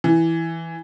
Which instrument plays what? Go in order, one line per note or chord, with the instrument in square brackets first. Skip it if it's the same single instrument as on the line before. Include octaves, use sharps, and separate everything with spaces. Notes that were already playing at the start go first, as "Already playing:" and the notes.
[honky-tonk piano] E3